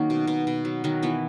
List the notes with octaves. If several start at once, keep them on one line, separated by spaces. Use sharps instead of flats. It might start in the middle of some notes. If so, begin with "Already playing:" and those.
Already playing: D#3 F#3 A#3 C#4 D#4
B2
B2
B2
F#3
D#3 F#3 F#4
E3 B3 E4